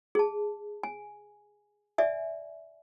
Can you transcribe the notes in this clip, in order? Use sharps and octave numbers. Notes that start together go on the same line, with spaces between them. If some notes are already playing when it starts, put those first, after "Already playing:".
G#4 A5
G#5
D5 E5 G#5